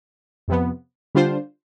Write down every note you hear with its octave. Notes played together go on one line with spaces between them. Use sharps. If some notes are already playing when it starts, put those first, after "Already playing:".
F2 C3 F3 B3
D3 G3 D4 F4 C5